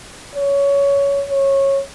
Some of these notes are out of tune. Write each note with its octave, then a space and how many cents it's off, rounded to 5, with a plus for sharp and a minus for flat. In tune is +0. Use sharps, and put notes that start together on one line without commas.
C#5 +15
C#5 -15